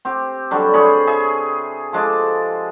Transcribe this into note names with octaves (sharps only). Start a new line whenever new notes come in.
C4 G4
D3 F#3 G3
C3 G#4 C#5 B5
G#4 E5
F3 G#3 A4 D6